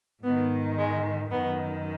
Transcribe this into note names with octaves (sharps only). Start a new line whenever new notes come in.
G#2 D#3 B3
G#3
F#2 D#3 B3